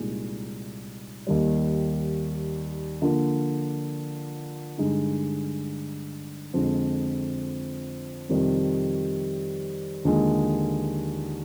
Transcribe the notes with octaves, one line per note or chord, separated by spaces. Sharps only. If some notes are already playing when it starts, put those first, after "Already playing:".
Already playing: C2 A#2 G#3 D#4
D#2 D#3 G3
D3 F3 A#3
G2 D3 G#3 D#4
F2 D3 F3 G#3
F2 C3 D#3 G3
D#2 D3 F3 G#3